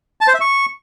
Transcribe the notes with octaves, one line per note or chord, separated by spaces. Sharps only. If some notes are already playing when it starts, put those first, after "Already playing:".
A5
C5
E5
C#6